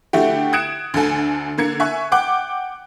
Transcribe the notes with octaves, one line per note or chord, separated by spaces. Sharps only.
D3 A3 E4 F#4 G4
D#6 F#6 G#6 C#7 D7 E7
D2 D3 A4 G#5
D3 A#3 G#6 C#7
E5 G#5 C#6 F#6
F#5 G5 D6 F#6